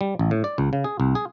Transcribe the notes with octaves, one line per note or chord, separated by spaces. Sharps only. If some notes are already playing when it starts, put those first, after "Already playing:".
G3
A1
A2
D5
C#2
C#3
G#4
C2
G#4